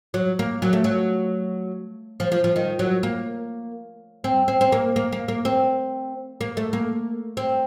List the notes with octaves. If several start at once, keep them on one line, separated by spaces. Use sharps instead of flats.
F#3
A#3
F#3
A3
F#3
F3
F3
F3
D#3
F#3
A#3
C4
C4
C4
A#3
A#3
A#3
A#3
C4
A#3
A3
A#3
C4